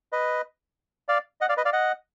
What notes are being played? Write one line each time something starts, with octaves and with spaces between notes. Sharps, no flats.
B4 D#5
D5 F5
D#5 F#5
D5 F5
B4 D#5
D5 F5
D#5 F#5